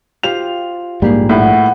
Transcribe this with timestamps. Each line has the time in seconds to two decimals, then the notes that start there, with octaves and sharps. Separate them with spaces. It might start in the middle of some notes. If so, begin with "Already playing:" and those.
0.23 F4 G4 C5 F7
1.02 A#1 G#2 G3 A#3 G4 G#4
1.29 A2 E4 B4 F#5